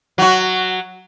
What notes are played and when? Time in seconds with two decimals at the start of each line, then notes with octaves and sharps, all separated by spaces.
0.18 F#3 F#4